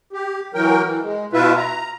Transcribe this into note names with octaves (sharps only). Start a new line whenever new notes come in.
G4
E3 F#3 A#4 G5
E3
G#3
B2 E4 F4 B4 E5
A#5